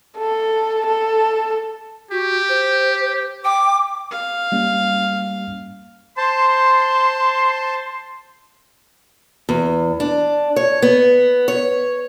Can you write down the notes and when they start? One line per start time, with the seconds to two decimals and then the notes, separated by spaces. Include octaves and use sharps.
0.18 A4
0.87 A4
2.11 F#4 G4
2.49 C5
3.45 G5 D6
4.11 F5
4.52 G3 A#3 C#4
6.17 C5 A5 C6
9.49 E2
10.00 D4
10.56 C#5
10.82 B3
11.48 C#5